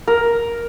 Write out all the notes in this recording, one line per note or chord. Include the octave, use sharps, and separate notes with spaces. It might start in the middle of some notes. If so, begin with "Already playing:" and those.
A#4